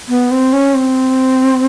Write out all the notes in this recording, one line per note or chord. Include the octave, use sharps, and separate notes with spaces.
B3
C4
C#4
C4